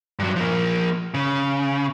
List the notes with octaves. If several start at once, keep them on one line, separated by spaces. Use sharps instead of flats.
G2 F#3
F3 A#3
C#3